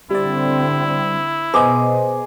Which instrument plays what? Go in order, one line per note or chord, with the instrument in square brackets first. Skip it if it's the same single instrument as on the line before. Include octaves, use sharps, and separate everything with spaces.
[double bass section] D3 C4 [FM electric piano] G3 D5 [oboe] E4
[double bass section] B2 [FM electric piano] B3 C5 D#5 [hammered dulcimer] G#4 D6